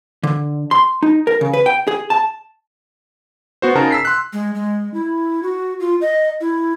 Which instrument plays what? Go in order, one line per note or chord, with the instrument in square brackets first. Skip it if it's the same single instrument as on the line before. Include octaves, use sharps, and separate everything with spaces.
[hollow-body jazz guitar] D3
C6
D#4
A#4
C#3
B4
G5
G#4
A5
[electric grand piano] B3 F#4 C5
C#3 D#4 A#4 A5 A#5
E6 B6 C7
C6 F#6
[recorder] G#3
G#3
E4
F#4
F4
D#5
E4